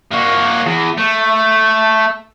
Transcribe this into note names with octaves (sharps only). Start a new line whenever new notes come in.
A#3 F#4
E2
A3